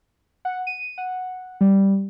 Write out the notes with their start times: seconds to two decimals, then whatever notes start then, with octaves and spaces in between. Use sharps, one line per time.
0.45 F#5
0.67 D#7
0.98 F#5
1.61 G3